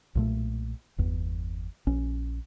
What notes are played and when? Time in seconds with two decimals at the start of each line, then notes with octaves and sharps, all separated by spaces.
0.15 B1 A#2 A3
0.98 G1 E2
1.87 A#1 C#4